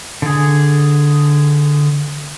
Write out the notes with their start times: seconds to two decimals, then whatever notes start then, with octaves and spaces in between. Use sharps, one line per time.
0.22 D3 G#4